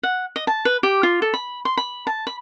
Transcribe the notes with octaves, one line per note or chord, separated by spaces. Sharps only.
F#5
D#5
A5
B4
G4
F4
A4
B5
C6
B5
A5
B5